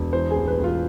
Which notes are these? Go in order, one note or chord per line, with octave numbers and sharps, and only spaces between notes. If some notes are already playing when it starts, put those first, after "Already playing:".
Already playing: E1
E3 C5
G#4
A1
B4
A1
F4